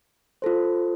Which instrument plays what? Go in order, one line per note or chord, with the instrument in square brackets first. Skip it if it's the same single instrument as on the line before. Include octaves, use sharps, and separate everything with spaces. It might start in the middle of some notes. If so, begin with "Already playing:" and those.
[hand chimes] F4 A4 C5